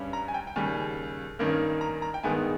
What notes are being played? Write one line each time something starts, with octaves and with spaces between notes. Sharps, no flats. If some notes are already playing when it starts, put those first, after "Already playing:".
Already playing: G2 G3 C#4
A#5
G#5
G5
G5
D#2 C#3 G3 C#4 G#5
G2 D#3 A#3 C#4
A#5
A#5
G5
G2 D#3 G#3 B3 G#5